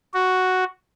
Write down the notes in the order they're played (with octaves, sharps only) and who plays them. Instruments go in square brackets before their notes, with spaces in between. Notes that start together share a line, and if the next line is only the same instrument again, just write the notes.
[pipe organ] F#4